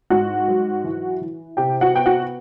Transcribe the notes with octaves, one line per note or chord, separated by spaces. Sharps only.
G#2 F#4 F#5
F#3
E3
E3
C3 G4 G5
F#4 F#5
B3 G5
F#4 F#5